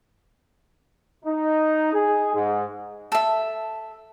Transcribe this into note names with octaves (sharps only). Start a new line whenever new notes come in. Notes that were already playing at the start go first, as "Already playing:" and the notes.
D#4
G#4
G#2
A4 E5